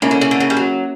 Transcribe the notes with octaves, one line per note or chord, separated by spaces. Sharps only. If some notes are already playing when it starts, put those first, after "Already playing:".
C#3 A#3 C#4 E4 A#4
D3
C#3
D3
C#3
G3
F#3